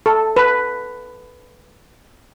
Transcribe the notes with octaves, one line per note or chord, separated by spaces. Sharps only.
A4
B4